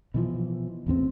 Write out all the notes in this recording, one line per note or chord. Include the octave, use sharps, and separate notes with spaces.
B2 E3 F3
A1 E2 B3 C4